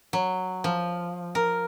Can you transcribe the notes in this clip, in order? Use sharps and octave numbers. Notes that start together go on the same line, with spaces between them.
F#3
F3
A#4